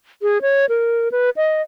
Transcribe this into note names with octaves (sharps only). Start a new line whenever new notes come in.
G#4
C#5
A#4
B4
D#5